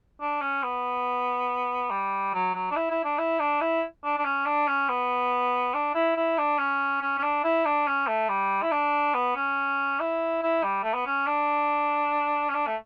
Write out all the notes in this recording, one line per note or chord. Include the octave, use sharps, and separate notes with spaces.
D4
C#4
B3
G3
F#3
F#3
D4
E4
E4
D4
E4
D4
E4
D4
D4
C#4
D4
C#4
B3
D4
E4
E4
D4
C#4
C#4
C#4
D4
E4
D4
C#4
A3
G3
E4
D4
B3
C#4
E4
E4
G3
A3
B3
C#4
D4
C#4
D4
A3